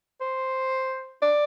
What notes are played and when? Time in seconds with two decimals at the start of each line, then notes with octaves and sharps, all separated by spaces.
0.21 C5
1.22 D5